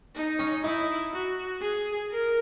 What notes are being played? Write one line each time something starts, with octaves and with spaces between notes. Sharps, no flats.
D#4
C#4
D#4 E4
F#4
G#4
A#4